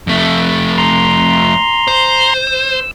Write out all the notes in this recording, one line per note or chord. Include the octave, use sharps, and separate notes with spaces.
F2 A3
A#5 C6
C5
E6